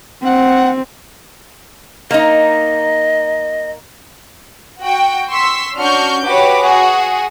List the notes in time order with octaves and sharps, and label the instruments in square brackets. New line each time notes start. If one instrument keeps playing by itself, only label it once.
[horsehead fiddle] C4 [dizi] F#5
[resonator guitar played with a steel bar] A#3 D#4 [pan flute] D#5
[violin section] F#4 G5
C6 C#6 E6 B6
C#4 D4 F#4 C#6 F6 G6
F#4 G4 B4 C#5 D6
F#4 G#4